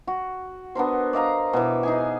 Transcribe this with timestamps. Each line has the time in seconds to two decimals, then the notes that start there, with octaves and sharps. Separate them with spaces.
0.07 F#4
0.75 B3 D4 A#4 C5
1.13 D5 D#5 F5 A#5
1.53 B2 E3
1.83 D#4 G#4 G#5